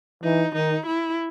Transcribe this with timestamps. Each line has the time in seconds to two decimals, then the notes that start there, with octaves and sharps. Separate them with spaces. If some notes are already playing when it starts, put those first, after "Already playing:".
0.23 E3 D#4
0.54 D#3 D#4
0.86 E4